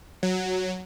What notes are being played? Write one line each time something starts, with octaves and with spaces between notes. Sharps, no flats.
F#3